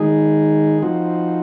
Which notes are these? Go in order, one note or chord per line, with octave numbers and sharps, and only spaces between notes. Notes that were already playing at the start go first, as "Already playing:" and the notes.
Already playing: D#3 G#3 D#4 G#4
F3 C4 D#4 F#4